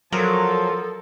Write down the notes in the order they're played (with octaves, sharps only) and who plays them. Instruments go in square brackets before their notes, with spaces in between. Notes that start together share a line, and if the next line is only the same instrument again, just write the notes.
[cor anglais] F3 [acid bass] F#3 [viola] A4 [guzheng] A#4